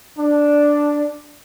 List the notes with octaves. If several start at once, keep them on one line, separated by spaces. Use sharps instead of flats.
D4